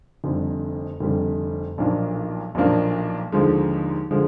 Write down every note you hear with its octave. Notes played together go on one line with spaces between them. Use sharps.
F1 F2 D3 G3
F1 F2 D3 G3
B1 A#2 F3 A#3 D4
B1 A#2 F3 A#3 D4
D#2 D3 F3 G#3
D3 F3 G#3